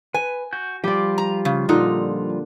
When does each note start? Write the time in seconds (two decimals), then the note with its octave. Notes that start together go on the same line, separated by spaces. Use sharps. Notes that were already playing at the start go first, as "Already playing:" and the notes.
0.14 B4 G#5
0.53 F#4 G6
0.84 F3 G3 F4 G4 D5
1.18 A#5
1.45 C#3
1.69 A#2 D3 D#4